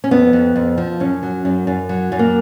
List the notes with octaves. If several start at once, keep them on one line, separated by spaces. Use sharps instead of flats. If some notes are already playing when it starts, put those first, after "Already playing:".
C#4
F2 B3
F2
F2
F3
F#2 C#4
F#3
F#2
F#2
F#3
F#2
A#3